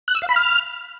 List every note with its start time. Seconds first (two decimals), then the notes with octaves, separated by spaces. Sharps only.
0.08 F#6
0.15 E6
0.22 F5
0.29 B5
0.36 F6